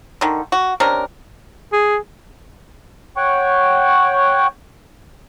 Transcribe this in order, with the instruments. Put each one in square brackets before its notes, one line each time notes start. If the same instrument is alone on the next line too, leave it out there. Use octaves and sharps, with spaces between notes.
[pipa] D3 D#3
F#4
C3 C#4 D4 A#4
[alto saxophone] G#4
[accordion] C#5 F#5 G5 C#6